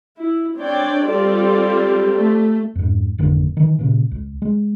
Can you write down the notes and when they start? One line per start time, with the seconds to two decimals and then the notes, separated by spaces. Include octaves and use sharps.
0.18 E4
0.58 C4 D4 C#5 D5 G5
1.08 G3 C4 F4 G4 A4 D5
2.18 A3
2.75 F2 G#2
3.18 G#1 F2 D3 A#3
3.57 D#3 E3
3.79 A#2 C#3
4.11 C#2
4.42 G#3